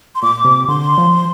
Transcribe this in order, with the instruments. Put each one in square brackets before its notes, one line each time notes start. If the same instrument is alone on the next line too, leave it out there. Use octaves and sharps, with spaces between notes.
[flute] C6
[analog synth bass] A#2 [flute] D6
[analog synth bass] C3
[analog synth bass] D3 [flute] C6
[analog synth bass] F3